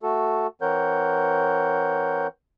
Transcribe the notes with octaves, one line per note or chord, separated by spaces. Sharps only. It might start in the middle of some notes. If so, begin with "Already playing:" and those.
A3 F#4 A4
E3 C4 A#4 C#5 F#5 G6